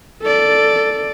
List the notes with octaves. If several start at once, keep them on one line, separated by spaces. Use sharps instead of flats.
A4 D5